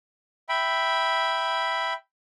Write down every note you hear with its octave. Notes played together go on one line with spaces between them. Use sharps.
E5 G5 B5